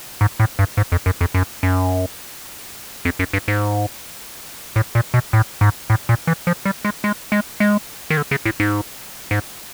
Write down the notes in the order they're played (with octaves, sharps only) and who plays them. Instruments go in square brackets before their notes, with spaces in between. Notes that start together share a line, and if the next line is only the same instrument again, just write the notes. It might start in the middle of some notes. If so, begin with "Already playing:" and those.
[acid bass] G#2
A2
G2
G#2
F2
F#2
F2
F#2
F#2
F2
F#2
G2
G#2
A2
A#2
B2
A2
G#2
A2
A#2
E3
F3
G3
G#3
G#3
G#3
G#3
D#3
D3
C#3
A2
G#2
G#2